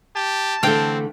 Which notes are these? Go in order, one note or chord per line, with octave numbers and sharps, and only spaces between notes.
G4 A5
D3 E3 A3 C4 F5 G5